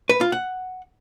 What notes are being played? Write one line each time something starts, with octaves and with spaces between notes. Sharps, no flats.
B4
F4
F#5